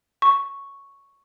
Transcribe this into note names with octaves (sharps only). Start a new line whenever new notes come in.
C#6